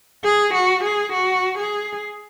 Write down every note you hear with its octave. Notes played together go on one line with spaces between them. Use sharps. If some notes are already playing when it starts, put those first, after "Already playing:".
G#4
F#4
G#4
F#4
G#4